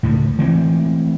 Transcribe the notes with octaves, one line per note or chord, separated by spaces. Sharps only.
C#2 A2
E3 G#3 A3 C4